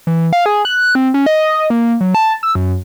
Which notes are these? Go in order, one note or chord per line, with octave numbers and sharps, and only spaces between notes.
E3
F5
G#4
F#6
C4
C#4
D#5
A#3
F#3
A5
E6
F#2